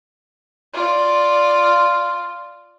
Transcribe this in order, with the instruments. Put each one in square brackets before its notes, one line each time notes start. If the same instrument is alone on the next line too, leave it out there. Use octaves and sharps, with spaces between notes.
[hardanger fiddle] F4 D5